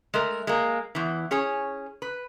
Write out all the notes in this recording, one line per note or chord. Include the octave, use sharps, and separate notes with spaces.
G#3 A3 A#4
G#3 A#3
E2 E3
C#4 G#4 C#5
B4